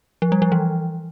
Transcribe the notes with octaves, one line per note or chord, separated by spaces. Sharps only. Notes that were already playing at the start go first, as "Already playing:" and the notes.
F3
G3
F3
E3